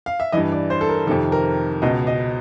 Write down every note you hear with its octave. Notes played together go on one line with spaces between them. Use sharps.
F5
E5
G2 E3 D#5
D5
C5
A4
A#4
F2 C3 D#3 A4
A#4
C#2 B2 D#5
D#5